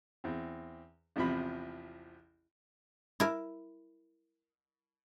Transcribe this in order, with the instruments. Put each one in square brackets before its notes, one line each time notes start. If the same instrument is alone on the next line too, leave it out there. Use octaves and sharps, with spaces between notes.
[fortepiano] E2 C4
A1 E2 C3 F3 B5
[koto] E4 A#4